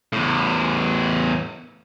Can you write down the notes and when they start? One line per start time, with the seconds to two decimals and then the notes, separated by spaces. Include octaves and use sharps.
0.13 E2 A2